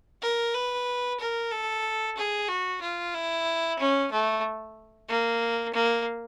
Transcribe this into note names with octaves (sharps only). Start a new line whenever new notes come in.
A#4
B4
A#4
A4
G#4
F#4
F4
E4
C#4
A3
A#3
A#3